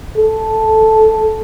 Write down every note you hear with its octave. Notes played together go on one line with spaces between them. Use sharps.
A4